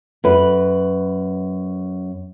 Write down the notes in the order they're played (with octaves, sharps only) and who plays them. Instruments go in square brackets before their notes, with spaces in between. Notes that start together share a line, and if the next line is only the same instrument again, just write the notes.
[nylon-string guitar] F#2 B4